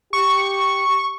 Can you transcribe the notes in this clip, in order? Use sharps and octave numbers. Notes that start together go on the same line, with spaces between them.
G4 C#6